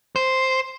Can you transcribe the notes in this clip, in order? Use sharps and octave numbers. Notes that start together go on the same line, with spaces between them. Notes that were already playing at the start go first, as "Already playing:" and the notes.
C5